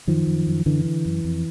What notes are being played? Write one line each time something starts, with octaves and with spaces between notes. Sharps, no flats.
F#2 D#3 F3
F#2
F#2
F#2 D3 E3
D3
F#2
F2